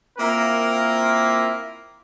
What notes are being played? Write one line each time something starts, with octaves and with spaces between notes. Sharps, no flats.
A#3 C4 E4 F4 A#4